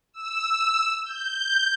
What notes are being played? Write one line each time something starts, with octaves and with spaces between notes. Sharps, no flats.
E6
G6